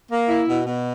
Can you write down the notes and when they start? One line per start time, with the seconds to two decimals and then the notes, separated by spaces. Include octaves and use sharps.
0.09 A#3
0.28 E4
0.47 B2
0.65 B2